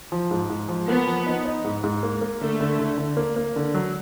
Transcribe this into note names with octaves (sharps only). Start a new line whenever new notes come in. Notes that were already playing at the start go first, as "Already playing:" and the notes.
F3
G#2
G#2
F3
A#3 B3
F3
D#4
D#4
G#2
G#2
A#3
A#3
D3 A3
D3
D3
D3
A#3
A#3
D3
F#3